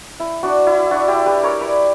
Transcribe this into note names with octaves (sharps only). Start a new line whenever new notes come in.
E4
D4 F#4
E4
D4 F#4
E4 G4
G4 B4
A#4 C#5
B4 D5